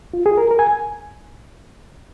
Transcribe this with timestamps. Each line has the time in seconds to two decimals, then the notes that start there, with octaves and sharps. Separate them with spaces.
0.14 F4
0.26 G#4
0.38 A#4
0.51 A#4
0.59 G#5